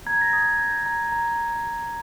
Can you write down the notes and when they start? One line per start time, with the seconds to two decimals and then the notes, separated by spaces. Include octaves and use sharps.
0.06 A#5 G#6
0.21 A#6
0.33 D#6 G#6
0.59 G6
0.86 A#5
1.12 A#5